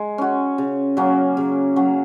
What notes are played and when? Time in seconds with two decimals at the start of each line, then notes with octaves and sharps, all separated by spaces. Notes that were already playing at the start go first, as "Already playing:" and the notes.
Already playing: G#3
0.18 C#4 F#4
0.58 C#3
0.97 F#3 A#3 C#4
1.37 C#3
1.76 F#3 A#3 C#4